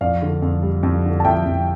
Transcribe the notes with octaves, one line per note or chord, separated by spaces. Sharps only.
F2 D5 F5
D3
F2
G3
F2
D3
A5
F2 E5 G5
F2